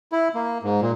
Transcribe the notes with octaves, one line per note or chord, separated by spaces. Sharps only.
E4
A#3
G#2
A#2